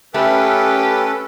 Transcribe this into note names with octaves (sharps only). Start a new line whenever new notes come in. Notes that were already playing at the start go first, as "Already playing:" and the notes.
A3 C#4 G4 A4 B4